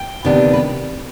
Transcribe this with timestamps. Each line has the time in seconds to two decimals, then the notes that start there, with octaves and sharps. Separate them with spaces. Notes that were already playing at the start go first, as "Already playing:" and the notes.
Already playing: G5
0.24 D2 C3 D#3 B3 D4
0.53 B4